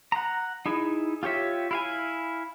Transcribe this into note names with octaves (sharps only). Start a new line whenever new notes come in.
F#5 A#5
D#4 E4 G#4
F4 G4 C#5 E5
E4 F5 G#5